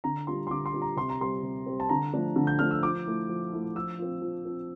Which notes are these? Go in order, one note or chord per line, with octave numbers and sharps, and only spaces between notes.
D3 A#5
G3 D4 F4 C6
C6
D3 D6
C6
G3 D4 F4
A#5
C3 C6
A#5
G3 C4 C6
C3
G3 C4
A5
D3 A#5
F3 A3 D4
D3
G6
F3 A3 D4 F6
E6
F3 D6
A3 E4
F3
A3 E4
F3 E6
C4 F4
F3
C4 F4